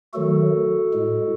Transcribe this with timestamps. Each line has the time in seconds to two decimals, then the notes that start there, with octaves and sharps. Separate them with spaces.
0.14 D#3 F#3 A3 F#4 A4
0.93 A2 G#3